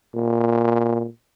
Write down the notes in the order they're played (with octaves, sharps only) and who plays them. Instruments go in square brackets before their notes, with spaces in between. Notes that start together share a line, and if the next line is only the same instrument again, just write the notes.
[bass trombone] A#2